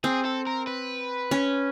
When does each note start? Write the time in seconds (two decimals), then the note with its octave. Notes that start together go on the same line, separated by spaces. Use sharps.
0.04 C4 G#4
0.25 A4
0.47 A#4
0.67 B4
1.31 C#4